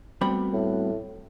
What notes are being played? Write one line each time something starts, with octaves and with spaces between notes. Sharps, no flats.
G3 A3 B3 C4 F#4 B5
A2